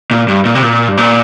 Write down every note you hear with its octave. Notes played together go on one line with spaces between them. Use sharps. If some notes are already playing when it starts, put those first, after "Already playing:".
A#2
G2
A#2
C3
A#2
G2
A#2